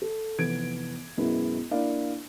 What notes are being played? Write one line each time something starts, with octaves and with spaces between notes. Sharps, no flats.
A4
F1 E3 B3 G#6 D7
F#2 B2 G#3 B3 E4
A#3 D4 E4 D5 F5